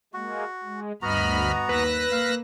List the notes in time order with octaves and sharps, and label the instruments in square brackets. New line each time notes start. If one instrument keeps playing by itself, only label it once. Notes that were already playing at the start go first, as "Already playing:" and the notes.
[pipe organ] G#3 A#3 [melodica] F#4
[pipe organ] G#3
[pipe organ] D2 B5 F6 [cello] G2 D#5 [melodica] B3 F#4 A#5
[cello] D#2 [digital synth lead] B4 [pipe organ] E6 F#6 A#6
[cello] A#3 [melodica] F5